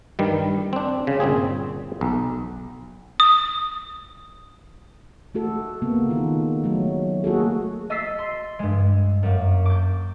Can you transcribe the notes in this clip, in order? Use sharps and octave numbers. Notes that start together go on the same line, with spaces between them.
G2 D#3 G3
C4 D4
C#3
G1 A#2 C4 G#4
B1
D#6
A3 F#4 A4
C#3 A#3 B3
D#3 F4
F#3 A3
A#3 F#4 G#4 A4
D#5 E6 A6 B6 C7
C6
G2 G#3
F#2 A#3
D6 G6